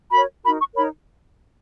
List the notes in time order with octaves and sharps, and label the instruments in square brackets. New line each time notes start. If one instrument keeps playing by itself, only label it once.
[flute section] F#4 A#4 C#5 B5
D#4 F#4 A#4 B5
C#6
D#4 A#4 C#5 B5